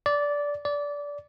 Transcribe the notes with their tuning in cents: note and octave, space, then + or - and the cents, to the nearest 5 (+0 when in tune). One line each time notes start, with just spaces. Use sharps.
D5 -15
D5 -20